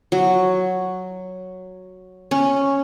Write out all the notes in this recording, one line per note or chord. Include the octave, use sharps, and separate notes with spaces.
F#3
C#4